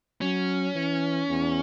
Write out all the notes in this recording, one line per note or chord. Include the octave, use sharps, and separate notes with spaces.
F#3 C#4
E3
E2